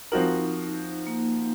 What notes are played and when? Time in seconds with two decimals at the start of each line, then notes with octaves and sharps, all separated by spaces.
0.12 F3 C4 D#4 F#4 A#4
1.07 A#3